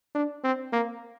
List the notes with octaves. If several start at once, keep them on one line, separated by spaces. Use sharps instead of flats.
D4
C4
A#3